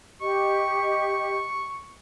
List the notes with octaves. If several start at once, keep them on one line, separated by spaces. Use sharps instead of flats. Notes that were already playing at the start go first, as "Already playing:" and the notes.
G4 D#5 C#6